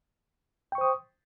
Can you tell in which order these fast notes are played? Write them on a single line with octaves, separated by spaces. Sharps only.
G5 C#6 C5 D#6